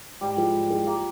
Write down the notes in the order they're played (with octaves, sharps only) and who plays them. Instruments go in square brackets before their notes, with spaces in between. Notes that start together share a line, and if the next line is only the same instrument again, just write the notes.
[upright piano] G#2 [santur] G3
[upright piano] F3 G#3
G#2
F3 G#3
[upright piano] F3 [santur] A#3